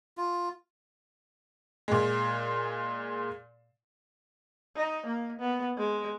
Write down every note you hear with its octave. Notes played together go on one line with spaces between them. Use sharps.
F4
A#2 G#3
D#4
A#3
B3
G#3